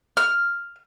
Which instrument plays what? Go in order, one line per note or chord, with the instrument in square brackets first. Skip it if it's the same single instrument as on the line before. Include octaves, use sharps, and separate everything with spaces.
[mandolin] F6